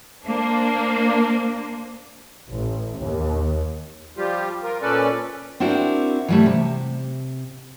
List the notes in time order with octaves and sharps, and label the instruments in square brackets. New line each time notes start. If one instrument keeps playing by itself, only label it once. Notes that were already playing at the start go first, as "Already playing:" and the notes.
[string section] A#3 D4 C5
[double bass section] A1
D#2
[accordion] F3 G3 F4 G4
F4 A#4
A#2 C#4 A4 B4 D5
[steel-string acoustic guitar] C4 D4 E4 F#4 A#4 C5
E3 G3 A3
C3